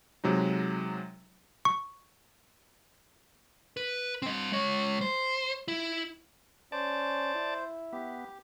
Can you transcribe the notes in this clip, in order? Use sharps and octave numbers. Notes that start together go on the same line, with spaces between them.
C3 F#3 G#3 D#4
C#6
B4
C4 D#5
G#3 C#5
C5
E4
C#4 C5 D5 A5
E4
B3 G4